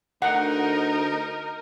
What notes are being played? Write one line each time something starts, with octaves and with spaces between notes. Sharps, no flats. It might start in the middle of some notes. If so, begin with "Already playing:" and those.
D2 D#4 A#4 F#5